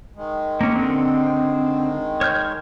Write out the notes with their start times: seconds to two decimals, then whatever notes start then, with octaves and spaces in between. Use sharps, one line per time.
0.16 D#3 G#3
0.61 A#3 C#4
0.76 D3 C4
2.21 C#5 F6 G6